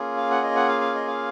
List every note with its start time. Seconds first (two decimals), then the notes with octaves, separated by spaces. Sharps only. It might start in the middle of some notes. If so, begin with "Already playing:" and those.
Already playing: A#3 C#4 F4 G#4
0.17 F5
0.31 F#5
0.43 D#5
0.56 F#5
0.69 F5
0.81 F5
0.95 D#5
1.08 F5